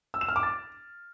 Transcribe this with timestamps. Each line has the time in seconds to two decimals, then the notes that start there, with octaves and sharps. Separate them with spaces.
0.14 E6
0.21 E7
0.29 F6
0.36 D6
0.43 A6